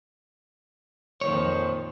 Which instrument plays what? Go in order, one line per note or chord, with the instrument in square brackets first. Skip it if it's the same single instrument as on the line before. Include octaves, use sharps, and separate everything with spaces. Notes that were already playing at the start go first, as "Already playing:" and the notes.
[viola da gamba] F2 A#2 D#3 [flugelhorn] C5 [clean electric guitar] C#5